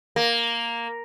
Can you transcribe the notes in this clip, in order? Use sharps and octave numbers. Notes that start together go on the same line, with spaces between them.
A#3